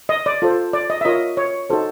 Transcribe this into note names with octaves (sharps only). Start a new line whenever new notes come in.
D#5
D5
F4 A4 C5
D5
D#5
E5
F4 A#4 C#5 D#5
C#5
D#4 F#4 A4 C5